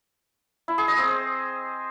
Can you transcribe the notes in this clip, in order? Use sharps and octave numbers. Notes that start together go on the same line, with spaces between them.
E4
G#4
D#5
C4
C5